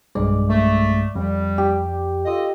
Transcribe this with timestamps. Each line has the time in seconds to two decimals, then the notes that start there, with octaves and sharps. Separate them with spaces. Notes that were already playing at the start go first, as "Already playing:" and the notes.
0.15 B1 G2 G#3 D5
0.49 A3
1.15 F2 G3
1.58 G4
2.25 F4 A4 D#5